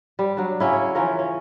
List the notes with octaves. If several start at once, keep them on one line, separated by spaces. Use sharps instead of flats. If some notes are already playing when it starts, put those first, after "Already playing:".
G3
F#3 D4
C#3 F#3 C#4 E4
C#5
E3 F3 C#4 A#4
C#4